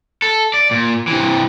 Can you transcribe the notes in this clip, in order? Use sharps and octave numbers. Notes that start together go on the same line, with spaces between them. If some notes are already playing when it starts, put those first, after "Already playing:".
A4
D5
A#2
C3 E3